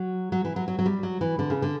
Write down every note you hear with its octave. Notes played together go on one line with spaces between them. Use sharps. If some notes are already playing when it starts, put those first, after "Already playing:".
Already playing: F#3
F#3
E3
F#3
F#3
F#3
G3
F#3
E3
D3
C#3
D3